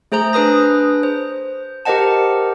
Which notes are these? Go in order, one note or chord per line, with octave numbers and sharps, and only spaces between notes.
A3 G#4 C5 A#5 G6
D4 G#4 B4 D#6 A#6
C5
G4 A#4 C5 D#5 F#5 A5